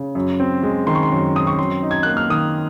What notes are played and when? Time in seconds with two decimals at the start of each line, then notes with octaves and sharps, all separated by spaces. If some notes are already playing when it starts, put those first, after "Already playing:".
Already playing: C#3
0.15 F#2
0.40 C4
0.63 G#3
0.87 D#3 C6
0.95 C#6
1.03 C6
1.11 F#2
1.35 C4 D#6
1.47 C#6
1.59 F#2 C6
1.83 D#4
1.91 G#6
2.03 A#3 F#6
2.17 F6
2.30 D#3 D#6